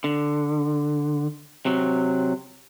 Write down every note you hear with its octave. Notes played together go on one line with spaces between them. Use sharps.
D3
C3 F#3